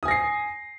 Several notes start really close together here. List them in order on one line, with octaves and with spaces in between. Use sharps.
D#6 G#5 A#6 C7